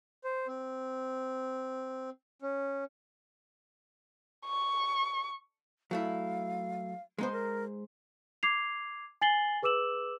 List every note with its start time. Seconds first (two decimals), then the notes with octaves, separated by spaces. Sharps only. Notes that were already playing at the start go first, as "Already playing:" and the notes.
0.24 C5
0.47 C4
2.42 C#4
4.46 C#6
5.91 F#3 A3 E4 F5
7.18 G#3 B3 D#4 C5
7.32 A#4
8.43 D6 G#6 C7 F7
9.21 G#5 A6 C7 F#7 G7
9.62 G#4 B4 D6 E6 E7 F#7